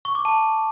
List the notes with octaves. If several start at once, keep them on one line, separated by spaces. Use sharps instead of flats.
C#6
D6
A5